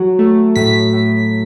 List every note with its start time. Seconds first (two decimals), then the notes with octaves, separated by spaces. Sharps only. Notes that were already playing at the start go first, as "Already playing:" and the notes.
Already playing: F#3
0.19 A3
0.56 A2 B6
0.93 A2